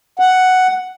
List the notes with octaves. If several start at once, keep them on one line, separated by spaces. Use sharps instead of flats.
F#5